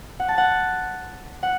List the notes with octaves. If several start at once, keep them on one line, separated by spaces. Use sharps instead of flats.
F#5
A5
F#5
F#5